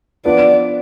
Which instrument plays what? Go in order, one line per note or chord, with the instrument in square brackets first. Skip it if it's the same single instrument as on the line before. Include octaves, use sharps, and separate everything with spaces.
[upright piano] F3 B3 D4 [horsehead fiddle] D5